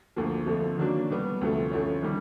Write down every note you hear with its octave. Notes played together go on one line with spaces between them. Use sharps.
D2 D3 F3 A#3
F2 D3 F3 A3
D#3 F#3 A#3 D4
B2 G3 B3
D2 C3 F3 A3
D2 D3 F3 A3 C#4
D#3 G3